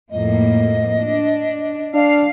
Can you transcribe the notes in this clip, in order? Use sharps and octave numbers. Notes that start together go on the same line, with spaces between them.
F2 A2 A#3 D#5
D4
D4 F5